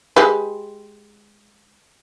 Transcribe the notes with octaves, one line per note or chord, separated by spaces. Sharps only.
G#3 G4 B4